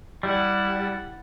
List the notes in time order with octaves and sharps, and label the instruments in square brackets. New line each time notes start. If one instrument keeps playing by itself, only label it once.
[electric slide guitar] G3 [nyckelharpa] E4 F#5